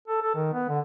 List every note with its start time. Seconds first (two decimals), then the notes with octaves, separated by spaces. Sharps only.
0.08 A4
0.22 A4
0.35 D#3
0.53 B3
0.69 D3